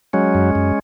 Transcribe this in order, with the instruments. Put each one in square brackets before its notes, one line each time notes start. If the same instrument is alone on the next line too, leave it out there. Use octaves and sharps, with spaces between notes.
[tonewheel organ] F#3 G#3 C#4
F#2
F#2